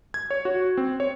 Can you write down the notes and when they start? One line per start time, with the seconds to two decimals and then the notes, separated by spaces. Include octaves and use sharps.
0.14 G#6
0.31 C#5
0.45 F#4
0.77 C4
1.00 C#5